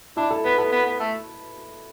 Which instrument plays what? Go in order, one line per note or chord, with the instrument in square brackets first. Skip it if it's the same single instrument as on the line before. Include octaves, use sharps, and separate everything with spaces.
[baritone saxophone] D4 [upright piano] E4
[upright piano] A4
[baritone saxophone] B3 [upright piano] B4
[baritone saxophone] B3 [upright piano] A4
[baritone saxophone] B3
B3
A3